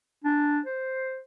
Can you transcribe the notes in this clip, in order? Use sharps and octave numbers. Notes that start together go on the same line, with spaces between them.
D4
C5